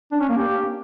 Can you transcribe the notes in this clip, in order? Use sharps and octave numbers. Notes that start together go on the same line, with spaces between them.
D4
C#4
A#3
G4